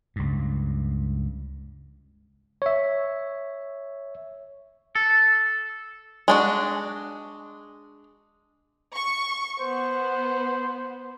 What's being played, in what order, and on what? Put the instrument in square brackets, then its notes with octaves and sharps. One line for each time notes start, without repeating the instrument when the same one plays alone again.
[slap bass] C#2 G2
[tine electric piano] C#5 E5
[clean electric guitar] A4
[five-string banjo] G#3 D4 F#4
[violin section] C#6
[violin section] B3 [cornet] C5